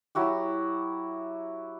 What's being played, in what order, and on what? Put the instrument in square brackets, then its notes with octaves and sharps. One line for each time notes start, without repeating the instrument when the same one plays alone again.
[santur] F#3 E4 F#4 G4